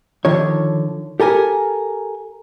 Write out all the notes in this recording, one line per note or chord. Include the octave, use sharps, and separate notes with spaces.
D3 D#3 F3 C#5
G4 A4 A#4 G#5